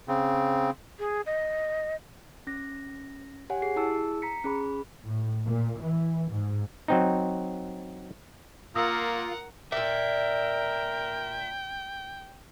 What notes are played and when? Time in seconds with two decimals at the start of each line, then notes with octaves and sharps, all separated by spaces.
0.08 C#3 C4
0.99 G#4
1.26 D#5
2.47 C#4 A#6
3.50 G4 C#5 F#5 G#5
3.62 G4 G#4 C7
3.76 E4 G#4 A5 E6
4.22 A#5 B6 C#7
4.44 C#4 G#4 B5
5.06 A2
5.46 A#2
5.81 E3
6.31 G#2
6.88 F#3 C4 D#4
8.75 A#3 F4 A#4 F#5 D#6 E6 A#6
9.72 A#2 A#4 D5 E5 G5